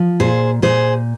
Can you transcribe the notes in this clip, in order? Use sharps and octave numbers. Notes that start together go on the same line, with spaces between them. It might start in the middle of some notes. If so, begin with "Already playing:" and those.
Already playing: F3
A#2 G#4 C5
A#2 G#4 C5